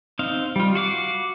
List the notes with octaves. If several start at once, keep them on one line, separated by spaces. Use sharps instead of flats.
C4 D#4 F5
G3 F4
F#4 F5 D6